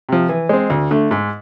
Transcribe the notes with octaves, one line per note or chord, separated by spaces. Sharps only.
C3 F3
E3
G#3 C4
D2
D3 A3
G#2